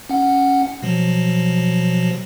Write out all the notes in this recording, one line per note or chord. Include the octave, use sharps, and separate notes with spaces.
C#4 F#5
B2 F3 F#3